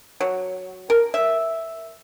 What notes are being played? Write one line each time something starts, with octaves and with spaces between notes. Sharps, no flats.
F#3
A#4
E5